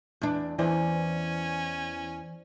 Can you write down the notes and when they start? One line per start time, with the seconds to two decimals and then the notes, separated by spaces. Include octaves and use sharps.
0.21 E2 D4
0.59 E2 E3 C#4 C5 D5 G#5